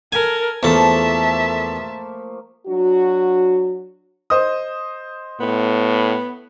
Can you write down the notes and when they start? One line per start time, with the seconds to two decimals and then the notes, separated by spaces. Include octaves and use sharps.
0.12 A4 A#4 G#5
0.63 E2 F3 A3 A#3 A4 E5 A5
2.67 F#3 D4 F#4
4.30 C5 D#5 D#6
5.40 A2 B3